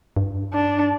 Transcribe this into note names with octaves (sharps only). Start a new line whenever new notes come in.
G2
D4